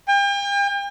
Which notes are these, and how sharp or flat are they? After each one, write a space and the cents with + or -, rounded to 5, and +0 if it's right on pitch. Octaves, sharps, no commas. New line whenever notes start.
G5 +40